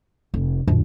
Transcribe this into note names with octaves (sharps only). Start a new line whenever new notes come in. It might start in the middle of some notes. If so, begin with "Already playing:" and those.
F1
D1 A#1 F2 A2 D3